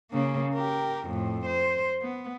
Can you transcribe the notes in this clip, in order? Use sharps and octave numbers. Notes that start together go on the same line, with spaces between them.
C#3 A#3
G4 A#4
F2 A2
C5
B3